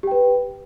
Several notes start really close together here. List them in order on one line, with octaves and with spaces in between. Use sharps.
G4 G5 B4